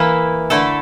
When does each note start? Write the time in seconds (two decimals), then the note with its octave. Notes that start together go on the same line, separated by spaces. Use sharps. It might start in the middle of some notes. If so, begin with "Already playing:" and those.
Already playing: E3 A#3 E4
0.50 D3 A3 E4 A4